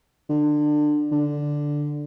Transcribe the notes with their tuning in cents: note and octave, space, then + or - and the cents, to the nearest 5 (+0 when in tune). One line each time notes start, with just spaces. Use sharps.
D3 +25
D3 +0